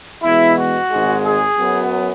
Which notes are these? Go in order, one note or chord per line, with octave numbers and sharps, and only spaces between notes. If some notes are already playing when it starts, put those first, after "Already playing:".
E2 B2 G#3 E4
F#4
G#1 G#2 G#3
G#4
F#2 F#3 B3